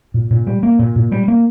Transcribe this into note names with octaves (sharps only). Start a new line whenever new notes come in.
A#2
A#2
G3
A#3
A#2
A#2
G3
A#3